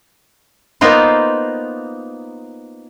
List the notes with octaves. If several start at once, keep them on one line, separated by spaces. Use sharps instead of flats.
A#3 B3 D#4 F4 C5